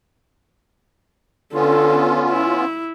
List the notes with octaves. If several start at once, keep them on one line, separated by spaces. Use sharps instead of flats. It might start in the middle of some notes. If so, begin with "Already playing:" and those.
D3 B3 C#4 F4 A4
E4